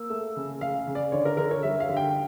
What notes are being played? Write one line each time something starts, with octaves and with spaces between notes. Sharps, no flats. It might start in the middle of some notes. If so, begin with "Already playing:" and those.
Already playing: A#3 E6
A3
C#3
C#3 F5
C#3
D5
D3 C#5
A#4
D3 A#4
C#5
G3 E5
F5
D3
G5